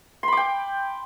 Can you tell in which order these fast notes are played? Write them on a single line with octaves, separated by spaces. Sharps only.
C6 B5 D6 G5